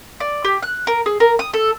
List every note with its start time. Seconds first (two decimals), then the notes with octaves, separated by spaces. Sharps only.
0.20 D5
0.44 G4
0.63 F#6
0.87 A#4
1.06 G#4
1.20 A#4
1.39 D#6
1.54 A4